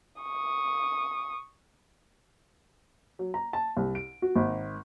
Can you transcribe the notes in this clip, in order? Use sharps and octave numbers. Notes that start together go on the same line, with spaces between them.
C#6 D#6
F#3
A#5
A5
C2
D7
F#4
G#1